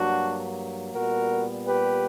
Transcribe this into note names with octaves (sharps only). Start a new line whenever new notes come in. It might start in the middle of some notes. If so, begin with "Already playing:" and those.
Already playing: G2 F#3 A#3 D4 F#4
A#2 G3 B3 F#4 A#4
G4 B4